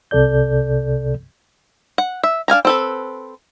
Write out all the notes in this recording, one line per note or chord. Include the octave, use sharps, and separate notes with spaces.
C2 C3 A4 D5 G6
F#5
E5
D4 F5 G#5 A#5
C4 A4 B4